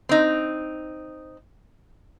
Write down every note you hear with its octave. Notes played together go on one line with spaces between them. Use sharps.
C4 D#4